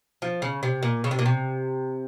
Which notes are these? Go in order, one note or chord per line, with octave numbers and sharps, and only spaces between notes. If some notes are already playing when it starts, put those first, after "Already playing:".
F3
C#3
C3
A#2
C#3
C3
A#2
C3